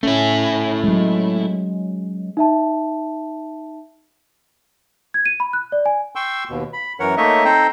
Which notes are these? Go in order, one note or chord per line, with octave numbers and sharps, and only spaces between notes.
A3 C#4 E4
F#3 G#3
D#4 E5 A5
G#6
D#7
B5
F#6
D5
G#5
G5 C6 C#6 E6
D#2 B2
B5
F#2 E3 A#4 C#5 F#5
A3 A#3 D#4 C#5 D#5 E5
C4 D#4 A4 C5 G5 A#5